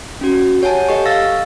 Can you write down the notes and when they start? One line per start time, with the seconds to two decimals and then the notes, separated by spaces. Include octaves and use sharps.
0.21 C#4 F#4
0.62 G4 C#5 F#5 G#5 A5
0.88 G4 A4 D#5 C#6
1.06 F5 E6 A6 A#6